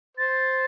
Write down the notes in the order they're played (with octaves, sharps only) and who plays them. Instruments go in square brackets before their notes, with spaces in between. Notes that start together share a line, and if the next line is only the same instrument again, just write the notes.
[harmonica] C5 [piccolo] A6